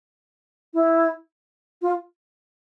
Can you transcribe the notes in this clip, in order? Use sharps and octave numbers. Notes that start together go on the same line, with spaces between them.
E4
F4